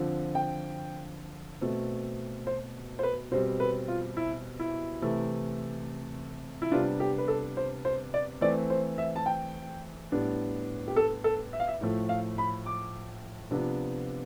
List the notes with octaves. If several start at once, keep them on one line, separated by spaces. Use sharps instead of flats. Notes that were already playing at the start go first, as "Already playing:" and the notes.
Already playing: D3 F3 C4
G5
B2 A3 C4
C5
C5
B4
B2 G3 C4 C5
B4
F4
E4
E4
C3 E3 A3
E4
C3 G3 B3 D4 F4
G4
B4
A4
C5
C5
D5
E3 A3 C4 D5
C5
E5
A5
G5
A2 G3 B3 D4
G4
A4
A4
E5
F5
E5
A2 F3 A3
F5
B5
D6
C3 F3 B3 D4